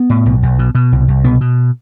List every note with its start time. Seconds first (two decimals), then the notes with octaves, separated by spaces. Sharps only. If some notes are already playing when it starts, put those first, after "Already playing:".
Already playing: B3
0.10 A2
0.26 B1
0.43 B1
0.59 B2
0.75 B2
0.92 C2
1.08 C2
1.24 B2 B3
1.41 B2